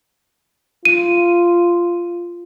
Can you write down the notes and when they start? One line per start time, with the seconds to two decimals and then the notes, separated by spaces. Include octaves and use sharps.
0.85 F4 D#7